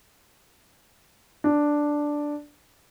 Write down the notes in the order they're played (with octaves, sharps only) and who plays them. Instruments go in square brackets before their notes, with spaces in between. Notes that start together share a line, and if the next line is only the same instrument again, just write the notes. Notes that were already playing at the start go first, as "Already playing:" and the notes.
[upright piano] D4